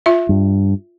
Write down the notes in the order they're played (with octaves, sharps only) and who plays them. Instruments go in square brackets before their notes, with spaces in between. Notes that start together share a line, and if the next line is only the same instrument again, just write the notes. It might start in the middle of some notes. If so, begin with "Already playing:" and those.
[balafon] F4 E5
[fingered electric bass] G2